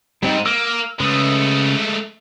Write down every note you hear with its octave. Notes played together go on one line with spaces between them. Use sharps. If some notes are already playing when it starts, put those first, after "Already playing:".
G#2 G3 C4 D#4
A#3 E6 F6
C#3 G#3 A3 B4 D#6